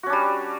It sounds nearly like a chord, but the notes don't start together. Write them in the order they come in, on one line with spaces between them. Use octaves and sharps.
F#4 C#4 D4 G3